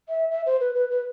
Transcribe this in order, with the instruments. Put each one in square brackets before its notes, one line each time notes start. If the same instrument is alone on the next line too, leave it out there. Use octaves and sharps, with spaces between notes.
[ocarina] E5
E5
C5
B4
B4
B4